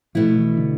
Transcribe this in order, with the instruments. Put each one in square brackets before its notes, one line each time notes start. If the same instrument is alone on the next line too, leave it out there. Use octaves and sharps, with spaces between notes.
[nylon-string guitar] B2 A3 E4 [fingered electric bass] F3
[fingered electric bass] E3
D3